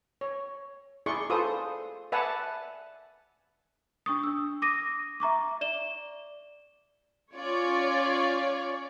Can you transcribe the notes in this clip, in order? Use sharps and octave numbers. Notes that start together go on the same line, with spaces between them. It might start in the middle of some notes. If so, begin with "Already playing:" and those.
C#5
E4 G#4 D5 C6 C#6
F4 G#4 A4 B4 C5 D#6
B4 D5 E5 F#5 G#5 A5
D4 C#6 D#6
D4 E6
D6 D#6 A#6 D#7
E5 A#5 C#6 D6
D5 E7 G7
C#4 F4 C#5 D5